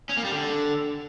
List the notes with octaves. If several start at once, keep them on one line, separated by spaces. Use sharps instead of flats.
C#4
A#3
G3
D3